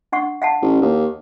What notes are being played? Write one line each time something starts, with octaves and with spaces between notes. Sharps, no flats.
D4 F#5 C#6
F5 F#5 A5
A1
D#2